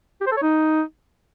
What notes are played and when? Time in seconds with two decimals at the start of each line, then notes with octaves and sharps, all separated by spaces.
0.21 G4
0.27 C5
0.32 A4
0.37 C#5
0.43 D#4